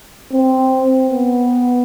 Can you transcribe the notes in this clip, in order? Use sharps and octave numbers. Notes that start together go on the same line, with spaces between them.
C4
B3